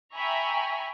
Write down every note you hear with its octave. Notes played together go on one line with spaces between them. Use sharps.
E5 G5 G#5 A#5 B5 C#6